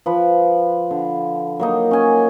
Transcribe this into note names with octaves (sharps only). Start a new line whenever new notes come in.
F3 B4
D3
F#3 A#3 D#4
C#4 G#5